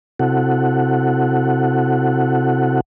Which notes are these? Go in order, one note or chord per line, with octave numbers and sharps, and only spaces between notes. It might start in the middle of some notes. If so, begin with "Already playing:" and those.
C3 C4 E4 F#4 A4 F#5